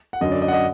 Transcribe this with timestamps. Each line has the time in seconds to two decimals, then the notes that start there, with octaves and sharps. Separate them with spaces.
0.13 F#5
0.21 F#2 D3 F#3 D#5
0.32 D5
0.42 D#5
0.48 F#5
0.53 D#5